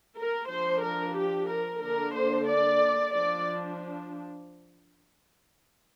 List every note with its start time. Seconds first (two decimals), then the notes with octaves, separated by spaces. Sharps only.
0.16 A#4
0.49 F3 D4 C5
0.82 A#4
1.16 G4
1.48 A#4
1.82 D3 A#3 D4 A#4
2.15 C5
2.48 D5
3.14 F3 D4 D5